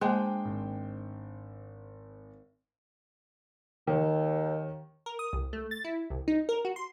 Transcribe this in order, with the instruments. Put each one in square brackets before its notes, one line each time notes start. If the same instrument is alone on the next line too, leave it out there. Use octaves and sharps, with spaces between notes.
[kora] G#3 D4 [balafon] A#3 [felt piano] C5 G5
[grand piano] G#1
[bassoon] D#2 [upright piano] D#3
[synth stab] A#4
D#6
C2
A3
A6
E4
C2
D#4
A#4
F#4
C6